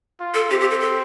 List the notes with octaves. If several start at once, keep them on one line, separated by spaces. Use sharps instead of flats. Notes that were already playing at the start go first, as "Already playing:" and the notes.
F4
A4
C4 G4
G4
A4
A4